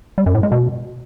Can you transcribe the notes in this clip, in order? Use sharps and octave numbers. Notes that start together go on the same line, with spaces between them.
G3
F#2
A2
G#3
B2